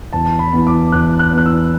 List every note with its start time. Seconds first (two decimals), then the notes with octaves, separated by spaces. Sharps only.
0.13 E2 A5
0.39 B5
0.53 E3 B3
0.67 D6
0.92 E2 F#6
1.19 F#6
1.33 E3 B3 F#6
1.46 E6